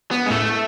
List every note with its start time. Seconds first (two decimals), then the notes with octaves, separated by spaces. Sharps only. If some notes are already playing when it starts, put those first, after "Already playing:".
0.11 B3
0.26 G#3
0.30 A2 A3